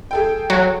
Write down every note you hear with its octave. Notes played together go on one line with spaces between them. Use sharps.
G#4 A4 G5
F#3